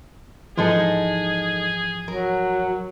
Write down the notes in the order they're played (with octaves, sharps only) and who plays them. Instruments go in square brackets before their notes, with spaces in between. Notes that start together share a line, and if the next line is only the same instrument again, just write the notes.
[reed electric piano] G#2 E3 F3 [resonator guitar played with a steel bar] G#3 D#4 A4 [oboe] G#4
[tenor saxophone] F#3 [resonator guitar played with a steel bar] A#4